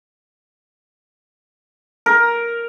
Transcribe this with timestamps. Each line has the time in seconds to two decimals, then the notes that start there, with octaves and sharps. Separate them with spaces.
2.06 A#4